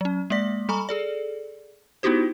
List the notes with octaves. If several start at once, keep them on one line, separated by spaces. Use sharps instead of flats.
F#3 C#4
G#3 A#3 D5 B6
G3 A4 G#5 A#5 B5 C#6
G#4 A4 D5
B3 D#4 E4 F#4 G4 C5